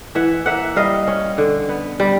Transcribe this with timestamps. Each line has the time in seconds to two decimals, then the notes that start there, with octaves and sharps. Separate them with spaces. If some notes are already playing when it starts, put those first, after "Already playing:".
0.15 E3 E5 F#5
0.46 A#3 E5 F#5
0.76 G3 D#5 F5
1.07 C#4
1.38 D3
1.69 B3
2.00 G3